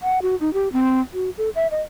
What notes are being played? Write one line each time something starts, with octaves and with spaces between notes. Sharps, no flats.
F#5
F#4
D#4
G4
C4
F#4
A4
E5
D#5